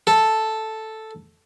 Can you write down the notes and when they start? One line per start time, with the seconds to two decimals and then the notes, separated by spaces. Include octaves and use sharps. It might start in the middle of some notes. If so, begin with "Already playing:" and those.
0.07 A4